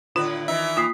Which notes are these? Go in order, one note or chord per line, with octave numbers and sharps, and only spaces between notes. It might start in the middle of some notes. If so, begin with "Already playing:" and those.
A2 D3 F4 B4
D#3 E3 D#4 E5
A#3 F4 D#6 B6 C7